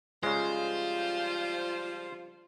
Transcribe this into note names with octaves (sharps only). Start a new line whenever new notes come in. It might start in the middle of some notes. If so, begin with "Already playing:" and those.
C#3 F3 G3 G#3 F4 C5